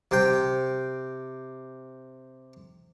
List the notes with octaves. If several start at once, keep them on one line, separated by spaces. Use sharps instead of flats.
C3 G5